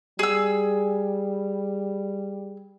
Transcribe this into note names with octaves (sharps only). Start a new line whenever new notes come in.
G3 G#4 E6